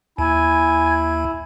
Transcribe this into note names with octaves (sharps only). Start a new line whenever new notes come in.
D#2 E4 G#5